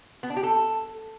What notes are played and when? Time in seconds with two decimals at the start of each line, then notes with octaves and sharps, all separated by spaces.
0.23 B3
0.30 D4
0.37 G4
0.43 A4